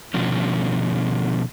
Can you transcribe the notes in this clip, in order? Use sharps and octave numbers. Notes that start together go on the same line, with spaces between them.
B2 D3 D#3 F3 C#4